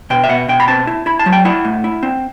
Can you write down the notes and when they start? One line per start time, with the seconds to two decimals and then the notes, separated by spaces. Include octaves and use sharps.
0.10 B2 G5
0.24 E5
0.29 B2 F#5
0.48 B2 G5
0.60 B5
0.68 C4 A5
0.87 E4
1.06 E4 B5
1.19 A5
1.26 F#3
1.32 G5
1.45 E4 F#5
1.65 A2
1.84 E4
2.03 C4